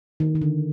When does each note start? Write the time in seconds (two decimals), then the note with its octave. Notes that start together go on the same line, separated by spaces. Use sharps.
0.20 D#3
0.35 D#3
0.41 D3